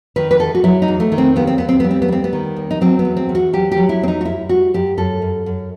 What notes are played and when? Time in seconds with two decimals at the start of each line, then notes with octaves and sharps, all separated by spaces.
0.16 D#3 B4
0.31 B4
0.40 E2 A4
0.55 F#4
0.64 F#3 E4
0.82 D#4
0.88 E2
1.00 A3
1.12 D#3
1.18 C4
1.36 D#2 B3
1.47 C4
1.58 D#2 B3
1.69 C4
1.80 G3 B3
1.91 C4
2.02 B3
2.08 G3 C4
2.24 B3
2.33 D#3
2.56 D#2
2.71 D#4
2.81 F#3 C4
2.99 B3
3.05 E2
3.17 C4
3.29 E2
3.35 F#4
3.53 F#3 G4
3.72 G4
3.77 F#3
3.89 E4
4.01 E2 C4
4.08 D#4
4.21 F#4
4.25 F#2 E4
4.49 G3 F#4
4.74 F#2 G4
4.97 F#2 A4
5.22 F#2
5.46 F#2